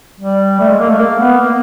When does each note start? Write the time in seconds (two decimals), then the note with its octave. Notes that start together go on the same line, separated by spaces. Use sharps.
0.20 G3
0.60 A3
0.69 G#3
0.80 A#3
0.89 A3
0.99 A#3
1.19 B3
1.38 A#3